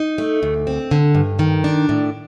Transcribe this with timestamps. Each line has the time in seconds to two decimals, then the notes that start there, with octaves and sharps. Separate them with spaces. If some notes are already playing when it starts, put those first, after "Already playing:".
Already playing: D#4
0.18 A3
0.43 D2
0.67 C4
0.91 D3
1.15 G2
1.39 D#3
1.64 D4
1.89 A2